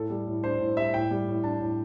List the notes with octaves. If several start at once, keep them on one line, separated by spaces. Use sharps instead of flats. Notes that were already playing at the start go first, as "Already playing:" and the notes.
Already playing: A2 A4
G3
A2
D4 C5
A2
G3 E5
A2 G5
G3
A2
D4 A5
A2